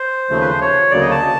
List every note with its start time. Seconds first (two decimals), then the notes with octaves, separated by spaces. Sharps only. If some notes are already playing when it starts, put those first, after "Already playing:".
Already playing: C5
0.30 D#2 C#3 F3 A3
0.41 B4
0.50 C5
0.61 C#5
0.91 D2 C#3 F#3 A#3 D5
1.01 D#5
1.11 A5